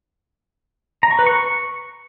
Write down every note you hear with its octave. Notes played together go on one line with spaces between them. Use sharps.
A#5
C#6
B4
C#6